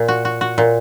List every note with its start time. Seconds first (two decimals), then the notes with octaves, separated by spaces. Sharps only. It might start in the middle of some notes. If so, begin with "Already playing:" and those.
Already playing: A#2
0.08 F#4
0.25 F#4
0.41 F#4
0.58 A#2